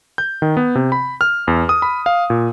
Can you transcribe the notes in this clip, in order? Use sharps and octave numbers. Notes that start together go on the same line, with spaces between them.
G6
D#3
B3
C3
B5
F6
E2
D#6
B5
F5
A#2